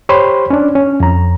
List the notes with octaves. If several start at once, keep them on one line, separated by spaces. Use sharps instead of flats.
G4 C5 C#5 B5 C6
C#4 D4
C#4
F2 A#5